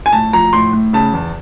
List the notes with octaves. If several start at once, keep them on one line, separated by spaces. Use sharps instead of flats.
G#5
A2 A5
F3 A#5
A2 C6
A2
C#3 A5
E2